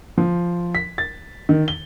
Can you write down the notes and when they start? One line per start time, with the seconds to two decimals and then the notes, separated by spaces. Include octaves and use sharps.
0.18 F3
0.75 B6
0.98 A6
1.49 D#3
1.68 G7